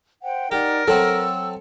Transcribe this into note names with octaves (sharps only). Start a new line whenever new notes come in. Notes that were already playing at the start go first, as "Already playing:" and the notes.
C5 F#5 G5
D#4 G4 A#4 D5 F#5
F#3 C4 F#4 A4 E6